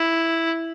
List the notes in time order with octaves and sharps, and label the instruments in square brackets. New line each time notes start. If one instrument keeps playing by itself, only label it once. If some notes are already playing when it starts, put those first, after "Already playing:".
Already playing: [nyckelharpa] E4